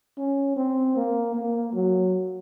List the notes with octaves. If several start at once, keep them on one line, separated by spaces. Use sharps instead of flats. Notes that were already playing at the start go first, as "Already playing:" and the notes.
C#4
C4
A#3
A#3
F#3